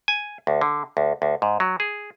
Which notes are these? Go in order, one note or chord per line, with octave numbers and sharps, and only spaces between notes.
G#5
D2
D3
D2
D2
G#2
F#3
G#4